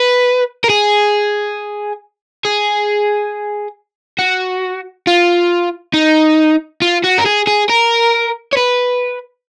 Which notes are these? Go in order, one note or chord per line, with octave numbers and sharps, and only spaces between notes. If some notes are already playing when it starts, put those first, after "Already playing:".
Already playing: B4
A#4
G#4
G#4
F#4
F4
D#4
F4
F#4
A#4
G#4
G#4
A#4
C#5
B4